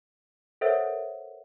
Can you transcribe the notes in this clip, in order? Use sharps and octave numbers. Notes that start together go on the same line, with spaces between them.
A4 A#4 C5 C#5 E5 F#5